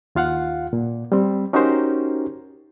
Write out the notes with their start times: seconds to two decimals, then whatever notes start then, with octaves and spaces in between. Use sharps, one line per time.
0.15 D#2 F4 F5 F#5
0.73 A#2
1.12 G3 C4
1.53 C#4 D#4 F#4 G4 A#4 C5